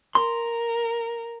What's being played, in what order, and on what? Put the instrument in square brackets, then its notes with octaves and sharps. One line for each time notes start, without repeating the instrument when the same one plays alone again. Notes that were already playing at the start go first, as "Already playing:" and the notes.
[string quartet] A#4 [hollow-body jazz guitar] C6